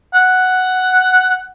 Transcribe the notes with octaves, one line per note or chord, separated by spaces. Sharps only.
F#5